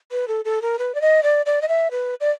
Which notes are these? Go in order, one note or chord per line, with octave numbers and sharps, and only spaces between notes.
B4
A4
A4
A#4
B4
D5
D#5
D5
D5
D#5
E5
B4
D5